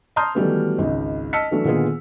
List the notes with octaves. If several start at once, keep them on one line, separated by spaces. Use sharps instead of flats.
A5 A#5 C6 D#6 F6 G6
D#3 E3 F#3 G3 A3 B3
G#1 C#2
D#5 A5 E6 F6 B6 C#7
E3 F#3 A3 D4
A#2 D3 D#3 B3 F4 G#4